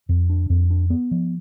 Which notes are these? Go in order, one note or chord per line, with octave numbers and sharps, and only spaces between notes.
F2
D4
F2
D4
B3
F3